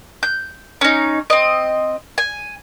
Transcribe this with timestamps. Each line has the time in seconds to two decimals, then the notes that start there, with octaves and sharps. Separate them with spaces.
0.23 G6
0.81 C#4 D#4
1.30 C4 D#5
2.18 G#5